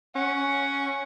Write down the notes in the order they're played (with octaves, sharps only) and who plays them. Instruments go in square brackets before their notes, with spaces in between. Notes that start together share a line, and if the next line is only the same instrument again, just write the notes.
[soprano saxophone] C#4 [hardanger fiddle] F#5